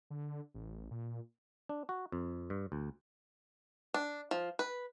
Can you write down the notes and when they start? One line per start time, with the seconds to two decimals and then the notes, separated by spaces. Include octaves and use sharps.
0.10 D3
0.54 A1
0.91 A#2
1.69 D4
1.89 F#4
2.12 F2
2.50 G2
2.72 D2
3.94 D4
4.31 F3
4.59 B4